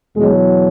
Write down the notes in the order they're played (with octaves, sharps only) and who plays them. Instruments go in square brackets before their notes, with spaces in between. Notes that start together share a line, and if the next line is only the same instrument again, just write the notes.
[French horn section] E2 B2 F#3 G#3